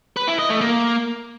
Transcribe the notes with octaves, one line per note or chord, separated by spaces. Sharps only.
B4
E4
D#5
A3
A#3